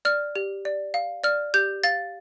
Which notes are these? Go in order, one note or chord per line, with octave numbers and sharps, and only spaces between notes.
D5 F6
G4
D5
F5
D5 F6
G4 G6
F5 A6